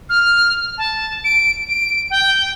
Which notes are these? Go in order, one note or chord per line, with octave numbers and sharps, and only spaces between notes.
F6
A5
D7
D7
G5